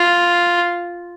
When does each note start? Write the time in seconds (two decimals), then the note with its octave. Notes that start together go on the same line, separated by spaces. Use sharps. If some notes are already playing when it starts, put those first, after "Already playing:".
Already playing: F4